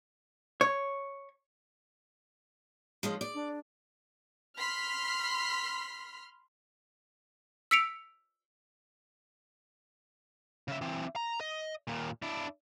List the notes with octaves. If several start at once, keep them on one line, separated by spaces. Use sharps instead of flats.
C#5
F3 G#3 C#4
D5
D4
B5 C6 F6 B6
E6 B6 C#7 D7 F7
C#3 E5
E3 C4
A#5
D#5
D#2 A#2
D4 E4